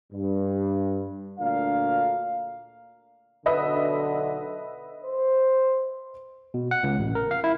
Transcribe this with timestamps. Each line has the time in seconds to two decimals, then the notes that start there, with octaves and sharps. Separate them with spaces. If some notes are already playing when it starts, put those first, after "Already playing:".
0.13 G2
1.39 D2 A#2 A3 D4 A#4 F5
3.46 B1 D3 B4 D#5 E5
5.04 C5
6.54 B2
6.71 F#5
6.83 C#2
6.99 A1
7.15 A#4
7.31 F5
7.44 E4